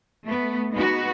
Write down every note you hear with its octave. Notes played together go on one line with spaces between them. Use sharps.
A3 B3
G#3 B3 D#4 F#4